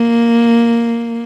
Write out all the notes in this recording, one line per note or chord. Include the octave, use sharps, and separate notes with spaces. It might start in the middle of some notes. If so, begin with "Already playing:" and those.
Already playing: A#3